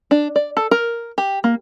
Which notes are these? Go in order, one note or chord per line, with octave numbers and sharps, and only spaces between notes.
D4
D5
A4
A#4
G4
A#3